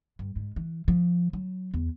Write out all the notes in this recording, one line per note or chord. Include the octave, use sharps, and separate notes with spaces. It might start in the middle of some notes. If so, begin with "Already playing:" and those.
G2
G#2
E3
F3
F#3
E2